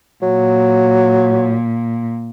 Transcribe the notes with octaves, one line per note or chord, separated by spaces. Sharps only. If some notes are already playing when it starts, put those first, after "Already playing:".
A#2 F#3